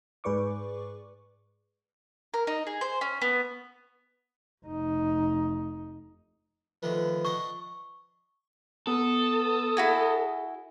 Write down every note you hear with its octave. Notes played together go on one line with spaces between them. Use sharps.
G#2 G#4 B4 D5 C#6 D6
A#4
D#4
G#4
C5
C#4
B3
F1 D#4
D3 D#3 F3 A3 B4
D4 D#5 F#5 C#6
B3 A4 D#6
E4 F#4 G#4 G#5